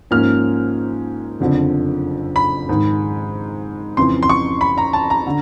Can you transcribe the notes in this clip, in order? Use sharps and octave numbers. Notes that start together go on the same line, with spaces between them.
G#2 F3 A#3 C#4 F6
F#1 F2 D3 F3
B5
G#2 D#3 G#3
F2 C#3 E3 C6
C6
C#6
B5
A#5
A5
A#5
D3